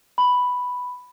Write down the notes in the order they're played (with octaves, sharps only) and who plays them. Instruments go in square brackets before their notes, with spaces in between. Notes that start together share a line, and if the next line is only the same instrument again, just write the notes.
[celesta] B5